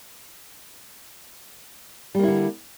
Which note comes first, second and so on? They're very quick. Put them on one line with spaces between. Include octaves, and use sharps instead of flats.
G3 A#3 E4 D3